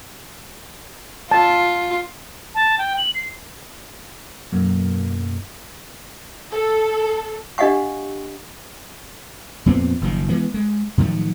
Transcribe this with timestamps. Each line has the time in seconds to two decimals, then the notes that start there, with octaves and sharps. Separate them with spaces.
1.31 F4 A5
2.55 A5
2.78 G5
2.98 F#7
3.15 C7
4.52 B1 F#2 F#3 A#3
6.51 A4
7.58 D4 G4 D#5 F5 F#5 C#6
9.66 F2 A#2 B3 C4
10.01 F#1 D#3 F3
10.29 E3 G#3 B3
10.54 G#3
10.98 A2 D#3 F3 F#3